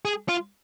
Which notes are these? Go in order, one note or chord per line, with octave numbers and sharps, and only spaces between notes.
G#4
F4